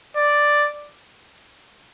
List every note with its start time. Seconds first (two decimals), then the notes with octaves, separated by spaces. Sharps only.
0.17 D5